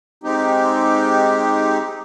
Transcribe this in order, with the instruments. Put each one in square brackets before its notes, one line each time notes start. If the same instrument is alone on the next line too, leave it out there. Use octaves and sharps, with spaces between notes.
[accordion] G#3 C4 D#4 G4